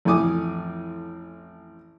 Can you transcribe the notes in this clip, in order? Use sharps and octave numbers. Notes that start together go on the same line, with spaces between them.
A1 F2 A2 G#5 D6 D#6